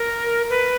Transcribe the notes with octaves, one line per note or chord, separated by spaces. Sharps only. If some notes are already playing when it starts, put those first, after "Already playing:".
Already playing: A#4
B4